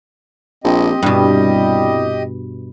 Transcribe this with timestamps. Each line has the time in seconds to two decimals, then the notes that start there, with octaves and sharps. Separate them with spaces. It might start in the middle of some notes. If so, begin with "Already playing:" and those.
0.64 A#1 C4 G4 D#5
1.02 C2 G2 B2 G3